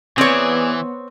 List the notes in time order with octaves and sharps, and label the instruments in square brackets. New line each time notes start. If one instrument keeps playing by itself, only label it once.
[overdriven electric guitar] E3 [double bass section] B3 [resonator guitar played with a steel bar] C4 C#5 [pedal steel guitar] G#4 D5